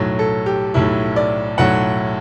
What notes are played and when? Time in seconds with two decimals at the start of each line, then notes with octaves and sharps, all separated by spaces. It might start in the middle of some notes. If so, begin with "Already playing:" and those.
Already playing: B1 A2 F#3
0.19 A4
0.46 G4
0.74 B1 A2 F#3 E4
1.16 D5
1.58 B1 A2 F#3 F#5